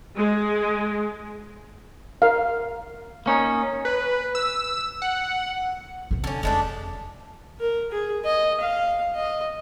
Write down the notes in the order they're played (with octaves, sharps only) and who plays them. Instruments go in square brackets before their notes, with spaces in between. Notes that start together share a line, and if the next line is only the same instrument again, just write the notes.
[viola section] G#3
[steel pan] A#4 F5
[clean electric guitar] A#3 C#4 D#4
[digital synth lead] B4
E6
F#5
[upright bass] E2 C3
[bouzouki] D3 C#4
[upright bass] F1 E2 [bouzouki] G#3 A3 D4
[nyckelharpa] A#4
G#4
D#5
F5
D#5